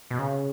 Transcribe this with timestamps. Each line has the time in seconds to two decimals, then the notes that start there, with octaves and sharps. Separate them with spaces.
0.11 B2
0.19 C#3